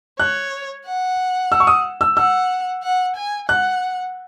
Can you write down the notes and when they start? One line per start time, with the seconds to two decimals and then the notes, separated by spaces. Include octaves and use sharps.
0.19 C#5 F#6
0.86 F#5
1.52 E6
1.60 C#6
1.67 D#6
2.01 E6
2.17 F#5 E6
2.83 F#5
3.16 G#5
3.49 F#5 F#6